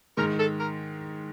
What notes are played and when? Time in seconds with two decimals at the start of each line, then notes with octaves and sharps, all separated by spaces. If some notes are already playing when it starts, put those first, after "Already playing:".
0.17 G#2 D#3 G#3 A#4
0.39 A4
0.60 A#4